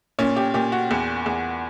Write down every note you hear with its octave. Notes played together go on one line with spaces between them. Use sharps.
A#2 C#4
G4
A#2 G4
F#4
E2
E2